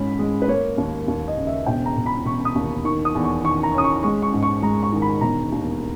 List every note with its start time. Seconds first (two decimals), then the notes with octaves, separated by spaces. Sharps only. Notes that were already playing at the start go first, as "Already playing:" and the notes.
Already playing: G#2 G#3 C#4 B5
0.19 G#3
0.42 B4
0.48 A#3 C#5
0.78 D#2
1.08 D#2
1.28 D#5
1.36 C#3
1.47 E5
1.66 E1 G5
1.86 A#5
1.97 E1
2.06 B5
2.25 E1 C#6
2.45 D#6
2.55 D#2
2.84 D#3 C#6
3.05 D#6
3.15 E2
3.24 C#6
3.44 D#3 C#6
3.63 A#5
3.74 C#4 D#6
3.84 C#6
4.03 G#3 C#6
4.22 C#6
4.33 G#2
4.43 C#6
4.62 G#3 A#5
4.83 C#6
4.92 D#3
5.02 B5
5.21 E1 A#5
5.52 D#2